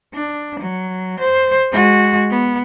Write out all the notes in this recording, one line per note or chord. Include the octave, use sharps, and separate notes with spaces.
D4
F#3
C5
G#3 F#4
B3